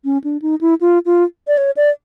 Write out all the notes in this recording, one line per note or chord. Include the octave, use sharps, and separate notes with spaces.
C#4
D4
D#4
E4
F4
F4
D5
C#5
D5